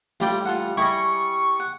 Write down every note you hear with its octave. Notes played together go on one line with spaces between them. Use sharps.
A1 G3 F4 D5 G5
F4 A4 F#5
G3 E4 G#4 D#5 C#6
F#5